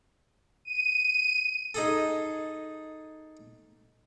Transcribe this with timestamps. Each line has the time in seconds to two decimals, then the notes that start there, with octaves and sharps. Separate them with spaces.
0.65 D#7
1.74 D#4 G#4 A4